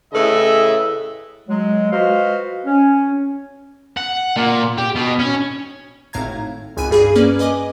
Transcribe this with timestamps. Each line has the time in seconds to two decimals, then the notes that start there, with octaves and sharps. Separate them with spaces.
0.13 A2 C#3 A4 B4 D#5 E5
1.49 F#3 G#3
1.92 F4 F#4 B4 C5 D#5 F5
2.66 C#4
3.97 F#5
4.36 A#2
4.78 G4
4.95 B2
5.19 C#4
6.13 G#1 A2 F5 A#5 G#6
6.77 G#1 C#2 G#5 B5 F#6 D#7
6.91 G2 G#4 B5
7.16 A#3 C#4 B4 D5
7.39 B4 D#5 G#5 D6